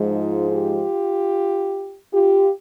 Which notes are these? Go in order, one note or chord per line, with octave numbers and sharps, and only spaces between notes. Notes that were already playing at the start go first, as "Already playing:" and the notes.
Already playing: G#2 F3 G#3
D#4 F4
F4 G4
F4 G4